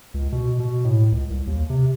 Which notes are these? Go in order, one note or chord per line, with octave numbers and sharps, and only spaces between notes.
C#2
B2
B2
A2
C#2
C2
D#2
C3